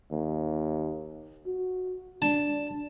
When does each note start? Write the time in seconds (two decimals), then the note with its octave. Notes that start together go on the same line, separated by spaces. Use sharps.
0.11 D#2
1.46 F#4
2.22 D4 A5